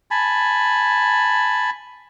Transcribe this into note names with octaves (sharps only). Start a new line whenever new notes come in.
G#5 A5 B5